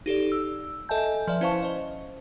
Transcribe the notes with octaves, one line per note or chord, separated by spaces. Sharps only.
D#4 G4 A4 D5
E6
A4 D#5 E5 G#5 A5 G6
F3 B4 D5 E5
C#4 E4 C5 F5 A5 C#6
C5 D#5